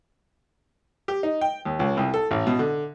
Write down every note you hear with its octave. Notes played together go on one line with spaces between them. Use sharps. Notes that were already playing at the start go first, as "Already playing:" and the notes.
G4
D#4
G5
D#2
C#2
C2
A4
A1
B2
D3